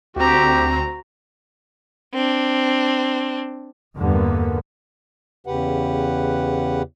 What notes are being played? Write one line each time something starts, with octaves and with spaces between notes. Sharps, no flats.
D2 C4 F#4 G4 A#5
C4 D4
E2 G2 D3 G3 A#3 B3
E2 C#3 G4 B4 F#5